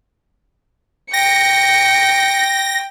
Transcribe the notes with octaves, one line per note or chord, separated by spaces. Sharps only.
G5 A#6 C#7